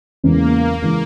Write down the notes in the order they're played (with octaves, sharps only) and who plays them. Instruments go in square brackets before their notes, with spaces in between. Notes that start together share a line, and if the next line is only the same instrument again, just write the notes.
[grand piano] E2 C#3 E3 G#3 C#4 [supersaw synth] A#3
[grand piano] C#3 E3 G#3 C#4